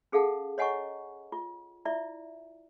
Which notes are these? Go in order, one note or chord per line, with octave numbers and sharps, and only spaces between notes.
C#4 G#4 A4 F5 F#5 A5
C#5 D#5 F#5 G#5 A#5 C#6
F4
E4 F4 D5 E5